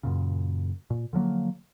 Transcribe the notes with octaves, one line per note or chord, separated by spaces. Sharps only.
F#2 A#2 C#3
A#2
D3 F3 F#3 A#3